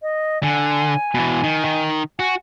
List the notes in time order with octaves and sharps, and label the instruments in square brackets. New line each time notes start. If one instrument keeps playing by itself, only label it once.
[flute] D#5
[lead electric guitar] D3 [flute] G#5
[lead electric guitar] B2 E3
D#3
D#3
[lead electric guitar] F#4 [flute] G#5